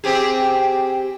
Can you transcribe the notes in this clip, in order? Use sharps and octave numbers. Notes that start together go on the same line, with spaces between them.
C4 G4 G#4